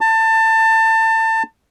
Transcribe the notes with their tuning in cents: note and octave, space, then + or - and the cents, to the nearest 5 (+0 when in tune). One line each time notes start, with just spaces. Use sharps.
A5 +25